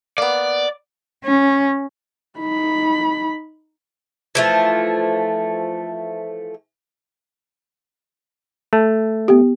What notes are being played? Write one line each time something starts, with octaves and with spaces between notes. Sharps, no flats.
A#3 B3 D5
C#4
D#4 B5
E3 F3 A3
A3 A5
B3 G4